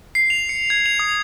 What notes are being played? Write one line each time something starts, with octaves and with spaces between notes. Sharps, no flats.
C7
F7
C#7
G#6
F7
D#6